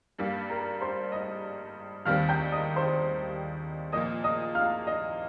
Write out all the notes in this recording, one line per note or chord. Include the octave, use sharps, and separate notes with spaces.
G2 G3 A#3 F5
A#4 A#5
C5 C6
D#5 D#6
D#2 D#3 G3 C4 F5 F6
G5 G6
D#5 D#6
C5 C6
A#2 F3 A#3 D#5 D#6
D#5 D#6
F5 F6
D#5